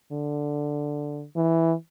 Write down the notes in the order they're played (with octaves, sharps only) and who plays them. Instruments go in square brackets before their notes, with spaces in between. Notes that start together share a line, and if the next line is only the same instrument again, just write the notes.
[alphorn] D3
E3